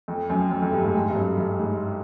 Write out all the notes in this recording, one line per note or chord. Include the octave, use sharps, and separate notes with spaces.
F2
F#2
F#2
F2
G2
G#2
G#2
G2
F#2
G2
G#2